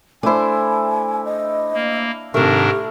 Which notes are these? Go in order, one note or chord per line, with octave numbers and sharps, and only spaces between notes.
A3 D4 E4 C5 G#5
D#5
A#3
G#2 C3 D#3 A3 D4 G4 A#4